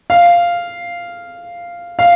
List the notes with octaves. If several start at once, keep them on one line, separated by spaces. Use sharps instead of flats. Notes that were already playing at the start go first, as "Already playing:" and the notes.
F5
F5